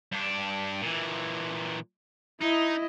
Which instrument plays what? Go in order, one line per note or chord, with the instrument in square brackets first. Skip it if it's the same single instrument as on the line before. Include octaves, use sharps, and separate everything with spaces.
[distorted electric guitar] G2 D4
A#2 E3
[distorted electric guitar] D#4 [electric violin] E4 D#5